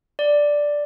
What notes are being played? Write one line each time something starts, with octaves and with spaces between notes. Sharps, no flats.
D5